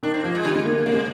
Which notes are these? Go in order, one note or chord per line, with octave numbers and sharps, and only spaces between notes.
D#3 D4
C4
F3 A#3
G#3
D3 G3
G#3
A#3
A#3
C3 A#3
G#3